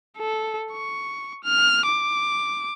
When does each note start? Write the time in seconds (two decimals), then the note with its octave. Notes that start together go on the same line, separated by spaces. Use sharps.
0.18 A4
0.72 C#6
1.44 F6
1.86 D6